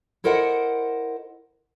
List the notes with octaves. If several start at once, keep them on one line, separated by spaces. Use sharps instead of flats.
E4 A4 A#4 C5 D#5 F#5